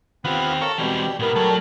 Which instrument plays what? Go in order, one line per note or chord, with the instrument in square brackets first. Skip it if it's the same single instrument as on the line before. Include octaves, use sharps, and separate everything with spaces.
[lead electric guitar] D#3 G4 [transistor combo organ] B3 F4 F#5 [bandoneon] C4
[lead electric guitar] A4 [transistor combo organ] A#4 C#5 F5
[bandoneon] B2 G3 [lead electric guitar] E3 G#3 [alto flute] C4 [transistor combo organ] G4
[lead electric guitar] A#2 E4 [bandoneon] G3 B3 [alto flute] A#4
[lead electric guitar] F#3 [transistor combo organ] A3 G4 A4